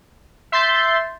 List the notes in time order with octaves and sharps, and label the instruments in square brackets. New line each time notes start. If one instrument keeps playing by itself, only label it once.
[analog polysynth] E5 C6 G6 A6